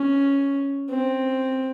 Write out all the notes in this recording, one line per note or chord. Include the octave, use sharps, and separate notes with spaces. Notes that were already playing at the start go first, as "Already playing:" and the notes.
Already playing: C#4
C4